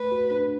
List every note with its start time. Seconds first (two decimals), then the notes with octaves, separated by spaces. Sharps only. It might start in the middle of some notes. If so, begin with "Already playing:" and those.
Already playing: A3 B4
0.12 F#4
0.31 D4